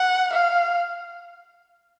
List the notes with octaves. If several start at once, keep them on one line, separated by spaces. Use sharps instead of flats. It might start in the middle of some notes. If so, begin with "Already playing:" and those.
Already playing: F#5
F5